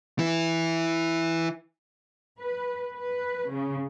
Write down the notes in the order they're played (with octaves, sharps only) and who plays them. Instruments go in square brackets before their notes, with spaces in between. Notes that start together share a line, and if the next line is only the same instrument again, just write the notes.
[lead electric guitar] E3 E4
[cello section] B4
B4
C#3